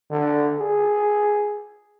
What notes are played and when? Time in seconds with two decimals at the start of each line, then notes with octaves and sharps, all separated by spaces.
0.10 D3
0.59 G#4